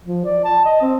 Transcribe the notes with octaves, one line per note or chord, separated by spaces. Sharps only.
F3
D5
A5
D#5
C4